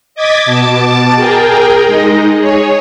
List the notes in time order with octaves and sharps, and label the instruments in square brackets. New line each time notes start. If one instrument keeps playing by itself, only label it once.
[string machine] D#5 D6 G#6 A6 B6
B2 A5 D6 A6
G#4 A#4 G5
G#3 D#4 D#5
G#4 C#5